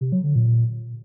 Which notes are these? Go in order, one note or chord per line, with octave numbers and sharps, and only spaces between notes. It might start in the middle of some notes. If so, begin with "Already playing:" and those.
C3
F#3
D3
A#2